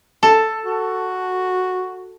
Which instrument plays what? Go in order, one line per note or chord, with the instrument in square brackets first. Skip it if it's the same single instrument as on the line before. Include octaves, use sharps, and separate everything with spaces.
[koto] A4
[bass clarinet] F#4